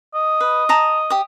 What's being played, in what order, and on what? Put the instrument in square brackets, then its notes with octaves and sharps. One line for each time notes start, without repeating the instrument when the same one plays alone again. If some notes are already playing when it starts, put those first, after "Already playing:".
[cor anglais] D#5
[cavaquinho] B4
A5 A#5 D#6
G4 D#6